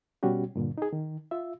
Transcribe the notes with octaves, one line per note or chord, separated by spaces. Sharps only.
B2 G3 C#4 F#4 G4
G2 A#2 D3
D#4 G#4
D#3
F4 E5